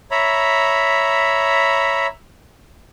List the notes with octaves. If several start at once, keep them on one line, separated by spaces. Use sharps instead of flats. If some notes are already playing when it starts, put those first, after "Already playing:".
C#5 E5 A#5 B5